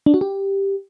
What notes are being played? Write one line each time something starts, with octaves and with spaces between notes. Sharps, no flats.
D4
F#4
G4